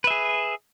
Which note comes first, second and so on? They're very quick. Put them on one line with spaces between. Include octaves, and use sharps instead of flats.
B4 E5 G#4